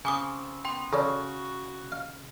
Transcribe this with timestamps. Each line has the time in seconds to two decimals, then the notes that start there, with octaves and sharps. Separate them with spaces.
0.05 C#3 C4 G#5 D6 D#6
0.65 B3 G5 C6
0.93 C#3 F#4 A4 C#5 D5
1.92 F5